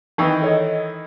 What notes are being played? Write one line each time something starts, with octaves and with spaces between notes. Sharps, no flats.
D#3 E3 D#4 B4 G5 C#6
A4 C#5 D#5